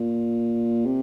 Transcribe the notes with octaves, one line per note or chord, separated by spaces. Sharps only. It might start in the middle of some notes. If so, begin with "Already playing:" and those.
Already playing: A#2
C3